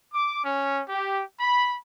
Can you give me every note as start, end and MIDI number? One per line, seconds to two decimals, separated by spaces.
0.14 0.43 86
0.44 0.80 61
0.89 1.20 67
1.40 1.76 83